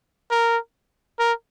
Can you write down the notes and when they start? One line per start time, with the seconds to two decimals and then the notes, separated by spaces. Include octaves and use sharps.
0.31 A#4
1.19 A#4